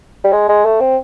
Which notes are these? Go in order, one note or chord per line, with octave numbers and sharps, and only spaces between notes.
G3
G#3
G#3
A3
C4